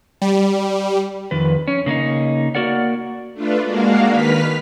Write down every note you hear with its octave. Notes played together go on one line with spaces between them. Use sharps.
G3
F2 D#3 B4
C#4
C#3 A#3 C#4 D#4
A#3 F#4 A#4 D5 F#5
A3 D4 F4 B4
G#3 A#3 D4 F#4 F5
D#3 B4 F6 B6